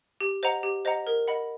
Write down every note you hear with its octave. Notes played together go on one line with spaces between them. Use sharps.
G4
C5 D#5 F#5 A#5
G4
C5 D#5 F#5 A#5
A#4
D#5 F#5 B5